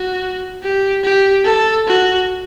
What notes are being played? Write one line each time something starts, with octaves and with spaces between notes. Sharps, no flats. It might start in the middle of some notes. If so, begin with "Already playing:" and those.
Already playing: F#4
G4
G4
A4
F#4